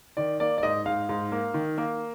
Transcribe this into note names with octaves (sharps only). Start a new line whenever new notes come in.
D#3 D5
A#3 D5
D5
G#2 D#5
G#2 F5
G#2
A#3
D#3
A#3